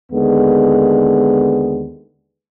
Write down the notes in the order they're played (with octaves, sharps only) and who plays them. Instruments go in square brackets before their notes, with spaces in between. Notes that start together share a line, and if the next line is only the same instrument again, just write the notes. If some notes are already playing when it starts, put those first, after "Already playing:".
[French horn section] D#2 D3 G#3 B3